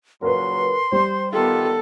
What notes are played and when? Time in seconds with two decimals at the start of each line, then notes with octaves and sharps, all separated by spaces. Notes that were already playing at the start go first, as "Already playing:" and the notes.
0.22 A#2 C#3 F#3 A#4 B4 C6
0.92 G3 C5
1.33 D#3 B3 F4 G4 A4